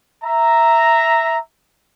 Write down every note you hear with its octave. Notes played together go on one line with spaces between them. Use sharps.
E5 A#5